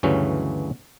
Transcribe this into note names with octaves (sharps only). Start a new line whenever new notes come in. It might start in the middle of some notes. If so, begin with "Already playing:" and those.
D2 G2 C#3 E3 F#3 C#4